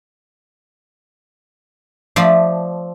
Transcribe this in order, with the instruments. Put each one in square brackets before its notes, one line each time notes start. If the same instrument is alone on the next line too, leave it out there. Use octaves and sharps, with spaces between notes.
[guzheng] F3 A3 D5